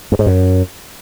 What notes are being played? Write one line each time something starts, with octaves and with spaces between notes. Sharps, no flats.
G2
G#2
F#2